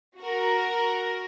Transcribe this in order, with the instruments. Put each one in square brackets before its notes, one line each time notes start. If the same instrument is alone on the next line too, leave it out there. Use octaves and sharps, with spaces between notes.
[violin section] F#4 A#4